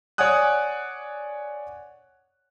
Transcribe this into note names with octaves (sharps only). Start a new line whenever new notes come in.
C#5 D5 F#5 G#5 D#6 F#6